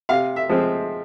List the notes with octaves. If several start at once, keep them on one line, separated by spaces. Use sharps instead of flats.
C3 F5
E5
F3 G#3 C4